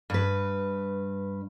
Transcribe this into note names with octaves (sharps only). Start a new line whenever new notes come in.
G2 B4